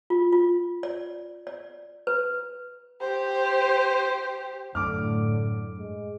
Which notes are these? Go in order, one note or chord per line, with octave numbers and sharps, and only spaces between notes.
F4
F4
D5
D5
B4
G4 C5
F#2 A2 D3 A3 D6 F6
G#3